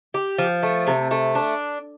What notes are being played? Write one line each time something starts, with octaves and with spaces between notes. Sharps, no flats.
G4
F3
A3
C3
A3
D4